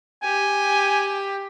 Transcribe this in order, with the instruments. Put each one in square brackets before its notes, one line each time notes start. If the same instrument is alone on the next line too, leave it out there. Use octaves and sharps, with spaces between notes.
[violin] G4 [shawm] G#5